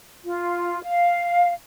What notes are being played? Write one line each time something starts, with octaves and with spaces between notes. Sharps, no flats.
F4
F5